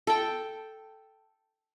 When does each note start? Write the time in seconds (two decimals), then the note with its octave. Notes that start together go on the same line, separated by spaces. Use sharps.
0.07 A4 G5